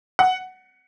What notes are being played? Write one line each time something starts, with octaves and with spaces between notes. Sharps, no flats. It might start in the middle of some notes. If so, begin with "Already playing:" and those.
F#5